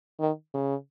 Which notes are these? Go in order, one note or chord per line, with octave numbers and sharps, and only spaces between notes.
D#3
C#3